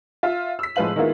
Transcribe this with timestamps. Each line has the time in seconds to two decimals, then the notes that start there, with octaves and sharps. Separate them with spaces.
0.23 F4 E5
0.59 E6 B6
0.76 A2 F3 G#3 B4 F5 F#7
0.96 D#3 G#3 A#3 B3 E4 F4